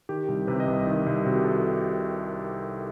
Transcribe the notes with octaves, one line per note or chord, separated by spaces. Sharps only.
D#3 G4
C2
C3 B4
D#5
C2
D#3
C2
C3 F#4
G4
A4